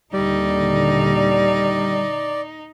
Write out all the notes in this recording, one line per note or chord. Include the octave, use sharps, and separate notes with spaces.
D#2 A#2 D3 G3 D#4 D5